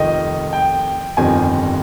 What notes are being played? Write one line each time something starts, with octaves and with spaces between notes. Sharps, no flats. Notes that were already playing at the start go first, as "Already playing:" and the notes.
Already playing: F1 F2 D#3 D#5
G5
G1 F2 C3 D#3 G3 G#5